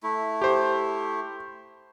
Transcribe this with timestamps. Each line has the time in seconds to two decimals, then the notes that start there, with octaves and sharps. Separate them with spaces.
0.03 A3 E4
0.42 G4 C5